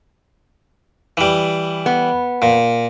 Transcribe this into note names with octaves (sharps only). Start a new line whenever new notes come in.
E3 G3
B3
A#2